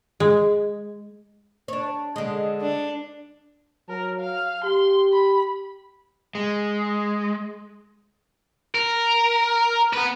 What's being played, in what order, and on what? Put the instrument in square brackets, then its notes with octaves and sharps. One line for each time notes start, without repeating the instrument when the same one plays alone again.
[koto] G#3
[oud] D4 C#5
D3 G#3
[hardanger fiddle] D4
[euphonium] F#3 [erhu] A#4
[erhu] F5
[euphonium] G4 [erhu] C6
[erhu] B5
[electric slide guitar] G#3
[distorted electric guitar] A#4
B3 B4